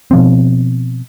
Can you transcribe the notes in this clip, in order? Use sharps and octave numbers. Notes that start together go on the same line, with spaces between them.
B2 F3 C4